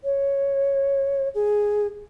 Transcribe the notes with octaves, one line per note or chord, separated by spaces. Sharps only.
C#5
G#4